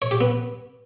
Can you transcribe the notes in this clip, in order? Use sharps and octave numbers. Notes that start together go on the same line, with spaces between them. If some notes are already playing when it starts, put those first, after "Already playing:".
C#5
G4
B3